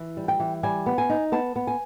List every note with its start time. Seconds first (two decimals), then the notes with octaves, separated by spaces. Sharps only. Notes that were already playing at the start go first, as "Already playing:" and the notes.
Already playing: E3
0.17 G3
0.28 G5
0.40 E3
0.63 G3 G#5
0.86 B3
0.98 G#5
1.09 D#4
1.32 B3 A5
1.56 B3
1.67 G#5